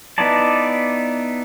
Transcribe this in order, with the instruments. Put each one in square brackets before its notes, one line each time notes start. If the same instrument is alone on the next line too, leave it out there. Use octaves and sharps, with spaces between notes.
[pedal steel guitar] B3 D#4 E4 D5 A5